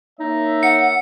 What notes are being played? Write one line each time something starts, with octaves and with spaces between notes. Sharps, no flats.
A#3 D#4 C#5 E5
F#5 C#7